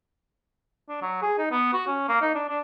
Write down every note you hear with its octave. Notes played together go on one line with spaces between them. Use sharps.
D4
F#3
G#4
D#4
B3
F#4
C#4
A#3
D#4
D4
D4